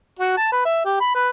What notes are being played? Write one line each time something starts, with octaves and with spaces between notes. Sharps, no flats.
F#4
A5
B4
E5
G4
B5
B4